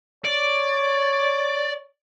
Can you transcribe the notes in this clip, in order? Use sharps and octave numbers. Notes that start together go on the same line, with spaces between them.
C#5 D5